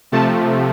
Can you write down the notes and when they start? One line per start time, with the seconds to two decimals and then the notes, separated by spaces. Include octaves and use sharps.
0.12 C3 F3 A3 A5